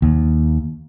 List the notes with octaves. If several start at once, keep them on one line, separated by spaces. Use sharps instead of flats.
D#2